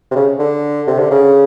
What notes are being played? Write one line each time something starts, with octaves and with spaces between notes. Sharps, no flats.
C3
C#3
D3
C3
D3
C#3